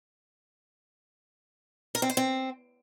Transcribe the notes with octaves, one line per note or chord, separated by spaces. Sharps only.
A#4
C4
C5
C4